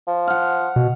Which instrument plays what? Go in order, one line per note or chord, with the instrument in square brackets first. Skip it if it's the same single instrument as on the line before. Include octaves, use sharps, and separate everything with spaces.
[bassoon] F3
[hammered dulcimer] F5 F#5
[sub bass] B2